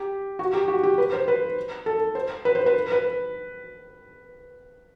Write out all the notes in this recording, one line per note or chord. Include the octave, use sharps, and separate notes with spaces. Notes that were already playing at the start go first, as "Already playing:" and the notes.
Already playing: G4
F#4
G4
F#4
G4
B4
C5
B4
A4
C5
B4
C5
B4
B4